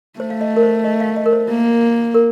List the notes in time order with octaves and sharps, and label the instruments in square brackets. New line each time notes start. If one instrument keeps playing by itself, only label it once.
[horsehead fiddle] A3 [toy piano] C5
[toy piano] F5
D#5
A#4
C5
D#5
F5
D#5
A#4
C5
[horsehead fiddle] A#3
[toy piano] A#4